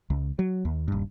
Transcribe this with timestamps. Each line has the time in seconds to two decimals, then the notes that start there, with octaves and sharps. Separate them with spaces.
0.10 C#2
0.39 F#3
0.65 D#2
0.88 D#1 G2